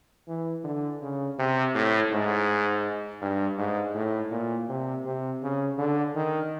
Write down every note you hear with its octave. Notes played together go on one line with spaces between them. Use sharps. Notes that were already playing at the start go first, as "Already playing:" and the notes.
E3
D3
C#3
C3
A2
G#2
G2
G#2
A2
A#2
C3
C3
C#3
D3
D#3